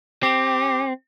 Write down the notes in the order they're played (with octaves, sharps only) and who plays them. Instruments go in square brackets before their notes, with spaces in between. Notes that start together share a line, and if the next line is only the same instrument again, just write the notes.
[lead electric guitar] C4 [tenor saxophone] G4